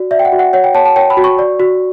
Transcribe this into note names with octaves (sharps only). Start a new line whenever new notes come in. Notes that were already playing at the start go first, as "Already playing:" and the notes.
Already playing: F#4 D5
D5 E5
G5
F#5
F#4
F#5
C#5 F#5
G5
C#5 A5
A5
C#5 G5
B5
F#4
C#6
D5
F#4